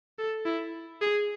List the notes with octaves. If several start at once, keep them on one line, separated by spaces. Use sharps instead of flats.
A4
E4
G#4